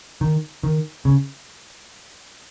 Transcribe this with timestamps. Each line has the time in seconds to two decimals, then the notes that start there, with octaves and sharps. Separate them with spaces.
0.21 D#3
0.63 D#3
1.05 C#3